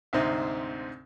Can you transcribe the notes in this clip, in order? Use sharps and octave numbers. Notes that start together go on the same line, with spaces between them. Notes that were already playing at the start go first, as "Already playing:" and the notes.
D2 G#2 C3 C4 D#4